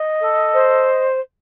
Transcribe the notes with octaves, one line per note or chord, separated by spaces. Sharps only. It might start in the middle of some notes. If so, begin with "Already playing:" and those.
Already playing: D#5
A4
C5